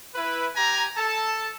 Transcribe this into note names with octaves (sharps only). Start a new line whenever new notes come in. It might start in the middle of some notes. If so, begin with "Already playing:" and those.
E4 B4
G4 G#5 A#5
A4 A5